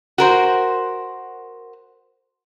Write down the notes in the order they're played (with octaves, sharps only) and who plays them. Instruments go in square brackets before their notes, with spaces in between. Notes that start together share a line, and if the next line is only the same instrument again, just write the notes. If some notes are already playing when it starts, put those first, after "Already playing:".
[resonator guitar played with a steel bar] F#4 A#4 C5